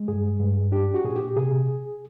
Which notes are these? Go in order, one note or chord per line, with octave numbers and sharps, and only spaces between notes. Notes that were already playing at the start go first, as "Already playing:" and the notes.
Already playing: G#3
G2 G#4
G2
D4 G4
F#4
A#2 G#4
G4
C3 G#4